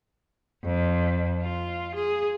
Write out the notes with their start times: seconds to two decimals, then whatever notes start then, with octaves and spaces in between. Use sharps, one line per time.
0.64 F2
1.42 F4
1.95 G#4